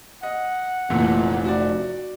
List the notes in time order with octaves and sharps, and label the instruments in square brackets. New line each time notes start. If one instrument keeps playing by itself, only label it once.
[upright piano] D#5 [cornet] F#5
[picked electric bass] F1 [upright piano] A#2 E3 A3
[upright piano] F#4 D5